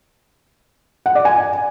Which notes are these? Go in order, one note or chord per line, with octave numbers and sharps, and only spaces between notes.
F#5
D5
G#5